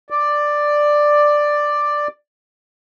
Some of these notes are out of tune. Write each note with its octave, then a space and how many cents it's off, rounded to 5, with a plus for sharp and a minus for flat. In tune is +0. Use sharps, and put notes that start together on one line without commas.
D5 +5